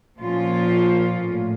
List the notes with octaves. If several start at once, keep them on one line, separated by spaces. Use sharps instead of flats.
A#2 F3 A#3 C#4 F4
A2